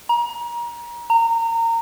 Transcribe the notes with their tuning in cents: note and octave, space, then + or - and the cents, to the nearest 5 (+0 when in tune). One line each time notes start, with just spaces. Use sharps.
A#5 +30
A#5 -25